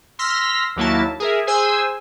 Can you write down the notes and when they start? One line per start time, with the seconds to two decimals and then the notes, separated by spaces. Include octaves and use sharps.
0.19 C6 E6 F6 A#6 B6
0.76 D#2 F#3 A#3 E4 A5
1.20 G#4 A#4 E5
1.47 G#4 C5 G#5 E6